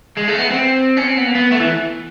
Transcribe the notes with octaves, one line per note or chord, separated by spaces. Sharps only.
G#3
A3
B3
C4
C#4
C4
B3
A#3
B3
A3
E3